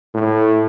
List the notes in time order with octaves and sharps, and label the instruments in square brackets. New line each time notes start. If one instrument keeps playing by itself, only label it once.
[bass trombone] A2